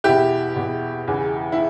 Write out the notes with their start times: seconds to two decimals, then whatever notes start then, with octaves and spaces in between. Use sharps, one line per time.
0.04 E2 B2 E4 G4
0.56 E2 B2
1.08 E2 C#3 E3
1.52 E4